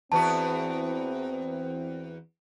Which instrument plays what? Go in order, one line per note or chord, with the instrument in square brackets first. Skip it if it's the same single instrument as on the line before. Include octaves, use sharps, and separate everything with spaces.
[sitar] E2 B3 F#4 [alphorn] C4 [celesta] A5